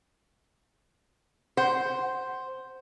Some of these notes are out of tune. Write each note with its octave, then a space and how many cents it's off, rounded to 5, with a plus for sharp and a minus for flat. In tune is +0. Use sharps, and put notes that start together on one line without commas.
C5 +0 F#5 +20